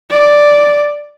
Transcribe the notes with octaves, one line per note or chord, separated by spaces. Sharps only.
D5